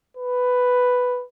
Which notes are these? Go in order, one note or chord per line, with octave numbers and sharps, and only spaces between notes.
B4